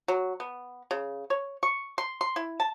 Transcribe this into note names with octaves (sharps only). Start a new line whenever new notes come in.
F#3
B3
C#3
C#5
C#6
C6
C6
E4
A5